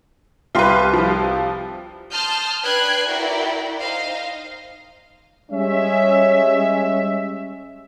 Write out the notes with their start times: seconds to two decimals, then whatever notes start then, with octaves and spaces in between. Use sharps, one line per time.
0.55 C2 F4 G4 B4 C6
0.94 F3
2.12 A5 C6 D#6 F6 G6
2.63 D4 B4 G5 F#6 G#6 C7
3.08 E4 F#4 A#4 D5 G5
3.76 D#4 C5 D#5 F5
5.51 G3 G#3 C#4 E5